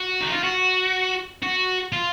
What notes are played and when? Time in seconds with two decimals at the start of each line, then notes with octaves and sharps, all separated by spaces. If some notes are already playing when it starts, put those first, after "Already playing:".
Already playing: F#4
0.21 D#4
0.32 F4
0.43 F#4
1.43 F#4
1.93 F4